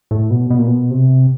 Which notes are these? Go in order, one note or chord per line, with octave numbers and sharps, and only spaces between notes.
A2
B2
B2
A#2
B2
C3